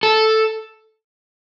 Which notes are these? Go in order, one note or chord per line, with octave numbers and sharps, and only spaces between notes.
A4